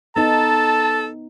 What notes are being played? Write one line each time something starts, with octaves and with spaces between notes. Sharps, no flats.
B3 D#4 A4 A5